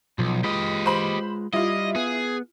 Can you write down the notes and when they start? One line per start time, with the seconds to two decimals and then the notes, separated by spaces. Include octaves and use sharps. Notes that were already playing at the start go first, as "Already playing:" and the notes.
0.19 B1 F3
0.44 G#3 F4 G4 B4 D#5
0.86 C5 B5
1.53 G3 E4 F4 D#5
1.96 B3 G#4